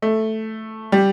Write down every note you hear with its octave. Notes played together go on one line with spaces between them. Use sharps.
A3
G3